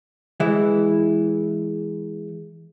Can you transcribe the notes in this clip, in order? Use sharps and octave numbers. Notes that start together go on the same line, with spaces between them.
E3 G#3 E4